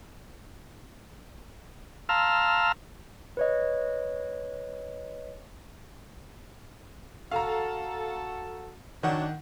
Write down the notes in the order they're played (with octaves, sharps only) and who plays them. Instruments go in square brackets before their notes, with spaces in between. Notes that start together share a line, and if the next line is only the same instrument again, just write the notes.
[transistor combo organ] F5 A5 A#5 C6 E6 F6
[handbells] B4 C#5 D#5
[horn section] F#4 A4 [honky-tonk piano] F5 A#5
[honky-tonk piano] D#3 F#5 [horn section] F#3 C#4 D4